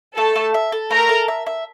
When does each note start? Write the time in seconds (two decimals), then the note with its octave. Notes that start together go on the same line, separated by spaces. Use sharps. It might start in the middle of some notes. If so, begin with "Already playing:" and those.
0.17 A3 A4 A5
0.36 A3
0.54 E5
0.72 A4
0.91 A3 A#4 A#5
1.09 A4
1.28 E5
1.46 E5